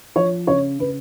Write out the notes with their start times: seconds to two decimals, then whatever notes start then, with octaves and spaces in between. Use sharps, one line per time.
0.16 F3 C#5
0.47 C#3 C#5
0.79 C#3 B4